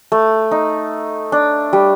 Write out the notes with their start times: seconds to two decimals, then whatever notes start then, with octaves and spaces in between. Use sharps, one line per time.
0.12 A3
0.51 D#4
1.32 D4
1.73 G3